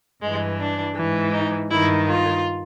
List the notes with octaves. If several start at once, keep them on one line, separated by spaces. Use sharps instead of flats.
G2 E3 G#3
D4
G#2 E3
D#4
G2 D#3 E4
F4